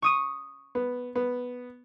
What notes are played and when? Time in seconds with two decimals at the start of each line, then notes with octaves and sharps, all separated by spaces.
0.02 C#6 D#6 D#7
0.75 B3
1.15 B3